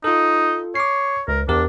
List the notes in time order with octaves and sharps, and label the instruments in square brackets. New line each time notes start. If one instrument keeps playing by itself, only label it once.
[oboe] D#4 [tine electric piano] F4 A4
[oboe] C#5 [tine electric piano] D6 C7
[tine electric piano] C#2 [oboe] A#4
[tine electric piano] E2 G4 A#4 [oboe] D4